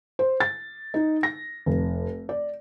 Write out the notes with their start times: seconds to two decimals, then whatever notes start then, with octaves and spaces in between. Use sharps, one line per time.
0.19 C5
0.40 A6
0.94 D#4
1.23 A#6
1.66 F1
2.29 D5